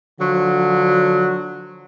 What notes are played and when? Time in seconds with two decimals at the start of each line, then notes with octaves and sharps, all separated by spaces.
0.19 D3 F3 F#3